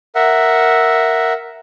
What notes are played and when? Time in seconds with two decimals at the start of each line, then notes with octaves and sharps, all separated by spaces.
0.15 A#4 E5 F#5